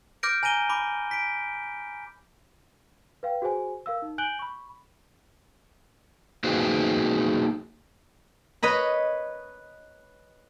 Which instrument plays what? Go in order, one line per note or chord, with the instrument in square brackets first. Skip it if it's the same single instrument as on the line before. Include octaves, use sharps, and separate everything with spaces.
[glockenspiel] D6 F6 G6 A#6 D7
G#5 A#5 A#6 D#7 G7
B5 D6
B6 D7
[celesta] B4 F5 G5
F#4 G#4 C5 G#5
A#4 F5 E6
D#4
G#5 F#6 G6 D7 F#7 G7
B5 C#6
[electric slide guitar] A#3 D#4 F#4 G#4 B4 C5
[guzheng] B4 C#5 D#5 B5